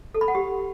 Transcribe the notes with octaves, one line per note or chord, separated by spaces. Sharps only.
A4
B5
F#5
G4